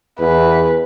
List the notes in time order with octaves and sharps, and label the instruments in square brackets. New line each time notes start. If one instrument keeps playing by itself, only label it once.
[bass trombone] E2 [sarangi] B4